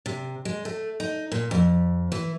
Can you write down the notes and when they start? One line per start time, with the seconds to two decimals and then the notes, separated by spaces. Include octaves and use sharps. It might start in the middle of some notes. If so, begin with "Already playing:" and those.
0.06 C3
0.45 G#3
0.65 A3
1.00 D#4
1.32 A#2
1.51 F2
2.12 E3